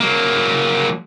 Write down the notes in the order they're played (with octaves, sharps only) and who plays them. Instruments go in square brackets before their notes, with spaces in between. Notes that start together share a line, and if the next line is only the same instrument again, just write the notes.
[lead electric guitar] F#3 A#3